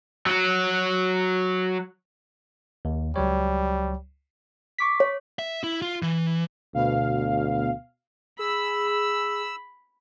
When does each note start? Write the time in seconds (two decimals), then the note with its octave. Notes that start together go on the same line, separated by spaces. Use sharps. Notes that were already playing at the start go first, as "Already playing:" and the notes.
0.26 F#3 F#4
2.85 D#2
3.16 C#2 F#3 G3 C#5
4.78 C#6 D6 B6
5.00 C#5
5.39 E5
5.64 E4
5.82 F4
6.03 E3
6.74 D2 B2 F5
8.39 G#4 B5 E6